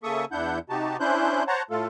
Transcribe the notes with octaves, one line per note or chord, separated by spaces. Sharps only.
C#3 A#3 A4 E5 C#6 D#6
E2 D4 E4 F#5 G6
C3 D#4 F#4 G4 A5
C#4 D4 E4 C5 F#6 G6
C5 C#5 F#5 A5 A#5
A2 A3 F4 A4